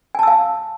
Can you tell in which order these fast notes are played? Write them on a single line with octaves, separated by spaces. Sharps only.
G#5 A5 E6 F5